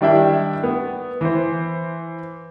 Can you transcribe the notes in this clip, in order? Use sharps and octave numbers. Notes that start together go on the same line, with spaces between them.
D#3 G3 D4 E4 E5 G5
B3
E3 C5